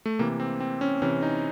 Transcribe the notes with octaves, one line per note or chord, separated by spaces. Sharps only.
A3
C3 E3 A#3
C4
C4
C#4
C3 E3 C#4
D#4